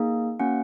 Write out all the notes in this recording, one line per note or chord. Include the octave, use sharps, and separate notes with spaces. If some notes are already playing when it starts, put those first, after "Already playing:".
Already playing: A#3 D#4 G#4
A#3 C#4 F#4 F#5